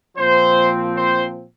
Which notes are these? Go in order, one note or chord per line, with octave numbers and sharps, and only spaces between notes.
A#2 F3 C4 C5
C5